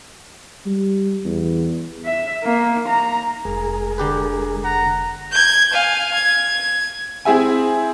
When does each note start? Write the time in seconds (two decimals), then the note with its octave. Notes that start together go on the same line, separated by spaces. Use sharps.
0.66 G3
1.25 E2
2.06 E5
2.44 A#3
2.88 A#5
3.45 F1 G#3 G#4 A#4
3.98 D3 G4 B4
4.64 F#5 A#5
5.32 G6 G#6
5.73 F5 G#5
6.14 G#6
7.25 C4 E4 G#4 E5 G#5